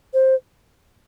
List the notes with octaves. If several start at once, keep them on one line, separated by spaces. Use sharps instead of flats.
C5